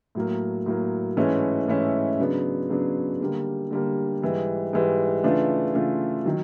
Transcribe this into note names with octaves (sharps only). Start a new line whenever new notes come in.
A2 F#3 A#3
A2 F#3 A#3
G#2 E3 A3 C#4 E4
G#2 E3 A3 C#4 E4
C#3 F#3 B3 D4
C#3 F#3 B3 D4
D3 G3 A#3
D3 G3 A#3
G#2 E3 G3
G#2 E3 G3
C#3 E3 A3 D4 F4
C#3 E3 A3 D4 F4
D#3 F#3